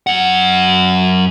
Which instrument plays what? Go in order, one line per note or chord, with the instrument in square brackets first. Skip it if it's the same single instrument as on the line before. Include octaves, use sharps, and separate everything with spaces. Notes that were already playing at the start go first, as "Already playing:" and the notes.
[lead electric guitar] F#2 F#5